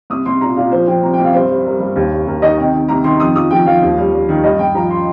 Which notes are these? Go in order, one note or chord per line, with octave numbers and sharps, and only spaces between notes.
C2 D#6
C2 C6
A#2 A#5
A#2 F5
F3 C5
F3 G5
C2 A#5
G5
C2
F5
G2 C5
G3
G3 A#4
G2
D#2
G3
D#2 A#4
D#3 D#5
C3 G5
D#3
C2 A#5
D#3 C6
F2 D#6
F3 D#6
F3 G5
F3 F5
D#2
G3
G3
D#3
G2 D#5
G2 G5
F3 A#5
C6